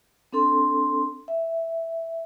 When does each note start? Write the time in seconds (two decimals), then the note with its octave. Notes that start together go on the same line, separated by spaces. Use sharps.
0.33 C4 D4 A4 C6
1.28 E5